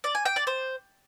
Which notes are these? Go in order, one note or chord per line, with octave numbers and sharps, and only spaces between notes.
D5
G#5
G5
D5
C5